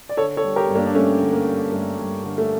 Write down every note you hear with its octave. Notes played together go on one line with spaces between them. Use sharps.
D5
D3 A4 C#5
A4 C#5
G3
G4 A#4
G2
A#3 D4
D4
G2 A3 C#4
D3
A#3
G3
G2 A3
G2
D3
A3